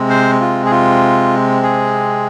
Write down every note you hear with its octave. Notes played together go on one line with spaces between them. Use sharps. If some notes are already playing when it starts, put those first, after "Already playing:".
Already playing: C3 G#3 C4
C5
F4
G#4
F4
G#4